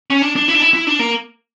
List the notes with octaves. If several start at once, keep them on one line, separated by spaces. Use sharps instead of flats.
C#4
D4
D4
E4
D4
E4
E4
D4
A#3